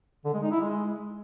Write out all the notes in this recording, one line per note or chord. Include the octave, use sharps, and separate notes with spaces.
D3
G#3
D#4
E4
G#3